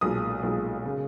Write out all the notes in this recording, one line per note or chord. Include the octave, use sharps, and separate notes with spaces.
B1 A#2 G#3 D#6
B1 A#2 G#3
C#3 G#3